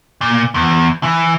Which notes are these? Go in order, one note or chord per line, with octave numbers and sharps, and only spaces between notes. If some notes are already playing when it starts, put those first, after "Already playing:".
A#2
E2
E3